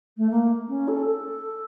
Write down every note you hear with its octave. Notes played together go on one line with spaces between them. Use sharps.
A3
A#3
C#4
A4
A4